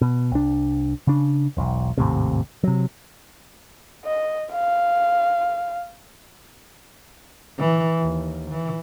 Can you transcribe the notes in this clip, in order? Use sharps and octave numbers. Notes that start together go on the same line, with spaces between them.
B2
C2 D4
C#3 D4
E1 B1
G#1 D#2 A2 C3
C3 F#3
D#5
F5
E3
D#2
E3